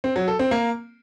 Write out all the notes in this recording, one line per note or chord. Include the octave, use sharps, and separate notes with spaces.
C4
F#3
A4
C4
A#3